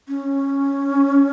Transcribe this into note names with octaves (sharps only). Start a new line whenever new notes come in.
C#4